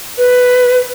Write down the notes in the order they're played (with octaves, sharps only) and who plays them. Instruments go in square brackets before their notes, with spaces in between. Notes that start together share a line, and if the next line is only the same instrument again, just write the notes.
[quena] B4